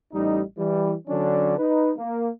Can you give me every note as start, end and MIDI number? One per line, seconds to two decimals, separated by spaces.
0.13 0.41 33
0.13 0.41 55
0.13 0.41 63
0.57 0.94 52
0.57 0.94 55
1.08 1.57 50
1.08 1.57 54
1.08 1.57 61
1.08 1.57 62
1.57 1.91 63
1.57 1.91 71
1.97 2.27 58